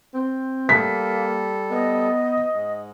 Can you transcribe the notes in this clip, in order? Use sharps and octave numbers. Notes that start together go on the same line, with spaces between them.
C4
G3 A#3 A4 B6
B3 D#5
G#2